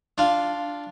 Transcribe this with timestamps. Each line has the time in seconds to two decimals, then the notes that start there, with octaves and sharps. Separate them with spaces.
0.18 D4 F4